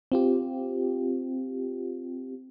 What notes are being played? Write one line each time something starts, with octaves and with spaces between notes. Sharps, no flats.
C4 F4 G4